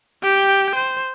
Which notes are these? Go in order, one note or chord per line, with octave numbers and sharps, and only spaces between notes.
G4 G5
C5